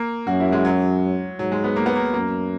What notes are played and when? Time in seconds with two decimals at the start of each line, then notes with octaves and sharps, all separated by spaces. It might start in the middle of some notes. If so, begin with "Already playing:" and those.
Already playing: A#3
0.27 F#2 F#4
0.40 E4
0.52 G#3
0.65 F#3
1.39 G#2 F#3
1.52 G#3
1.64 B3
1.76 A#3
1.86 B3
1.96 A#3
2.14 F#2 A#3